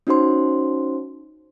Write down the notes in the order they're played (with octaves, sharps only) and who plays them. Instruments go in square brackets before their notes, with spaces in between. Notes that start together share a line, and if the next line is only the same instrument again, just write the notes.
[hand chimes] C#4 D#4 F#4 C5 C6